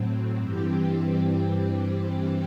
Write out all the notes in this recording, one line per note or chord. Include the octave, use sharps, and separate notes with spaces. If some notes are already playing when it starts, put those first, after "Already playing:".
Already playing: A2 F#3 C4
G2 E3 G3 C4 G4